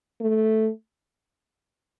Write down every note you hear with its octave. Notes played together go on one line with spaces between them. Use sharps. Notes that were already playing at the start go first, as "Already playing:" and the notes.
A3